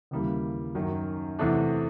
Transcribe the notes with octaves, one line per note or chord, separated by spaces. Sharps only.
D#2 C#3 E3 G3 A#3
F#2 D#3 F#3
E2 C3 E3 A3 D4